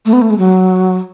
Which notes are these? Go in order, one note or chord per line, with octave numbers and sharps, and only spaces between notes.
A3
B3
A3
G#3
F#3